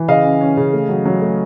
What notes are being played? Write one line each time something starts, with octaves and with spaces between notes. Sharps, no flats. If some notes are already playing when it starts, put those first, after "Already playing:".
Already playing: E3
C#3 D#5 F5
C#4
C#4
C#3
A3
F#3
F#3
A3